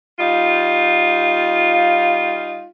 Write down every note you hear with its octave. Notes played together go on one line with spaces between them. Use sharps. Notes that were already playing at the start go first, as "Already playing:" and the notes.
G3 D#4 F4